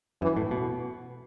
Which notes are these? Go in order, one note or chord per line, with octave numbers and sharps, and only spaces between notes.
F#2 E3
A2
B2